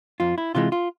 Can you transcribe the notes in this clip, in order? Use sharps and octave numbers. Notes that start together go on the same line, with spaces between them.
F2 F4
E4
C3 E3 G#3 F4
F4